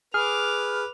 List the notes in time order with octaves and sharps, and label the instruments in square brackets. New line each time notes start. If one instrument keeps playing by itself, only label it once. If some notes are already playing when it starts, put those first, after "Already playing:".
[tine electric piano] G#4 [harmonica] B4 [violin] D6 F7 [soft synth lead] F6